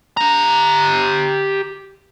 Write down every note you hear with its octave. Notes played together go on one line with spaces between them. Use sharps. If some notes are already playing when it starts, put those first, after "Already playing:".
G4 A#5